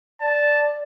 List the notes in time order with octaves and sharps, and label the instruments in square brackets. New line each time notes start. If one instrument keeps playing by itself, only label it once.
[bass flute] D5 [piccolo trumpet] A5